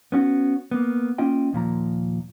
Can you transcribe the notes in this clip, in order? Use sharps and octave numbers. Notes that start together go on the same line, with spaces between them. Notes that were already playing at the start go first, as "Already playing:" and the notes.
B3 C#4 F#4
A#3 B3
A#3 C#4 F4 D#5 G5
D#2 A#2 F3 A#5